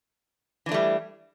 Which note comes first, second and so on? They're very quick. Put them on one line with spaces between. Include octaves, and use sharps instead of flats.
E3 D4 A3 G3